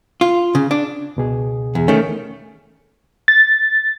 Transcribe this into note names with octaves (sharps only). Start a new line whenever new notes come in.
F4
C#3
D4
C#2 B2 G#4
E2
D#3 A3 C#4
A6